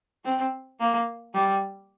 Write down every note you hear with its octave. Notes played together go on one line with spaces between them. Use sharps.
C4
A#3
G3